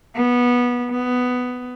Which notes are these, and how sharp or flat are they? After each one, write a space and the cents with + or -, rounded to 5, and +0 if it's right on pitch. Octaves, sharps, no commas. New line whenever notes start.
B3 -15
B3 +10